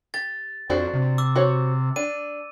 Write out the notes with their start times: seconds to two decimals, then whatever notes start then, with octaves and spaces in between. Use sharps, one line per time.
0.14 G4 A6
0.70 F2 D4 F#4 C5
0.94 C3
1.18 D6 E6
1.35 F#4 C5 C#5
1.96 D4 D#7